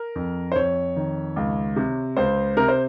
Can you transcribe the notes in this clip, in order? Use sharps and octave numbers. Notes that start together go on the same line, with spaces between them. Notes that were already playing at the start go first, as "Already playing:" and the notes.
Already playing: A#4
F2
C5
F2 C#5
D#3
C#2
C3
C#2 C5
C3 A#4
C5